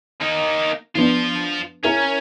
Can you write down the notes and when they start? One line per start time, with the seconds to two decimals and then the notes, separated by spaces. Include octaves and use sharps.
0.21 A#3 D#4
0.95 F3 B3 D4 F4 C5
1.84 C#4 E4 A#4